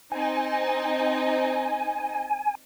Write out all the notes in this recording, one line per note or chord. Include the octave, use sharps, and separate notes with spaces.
C4 D#4 D#5 G#5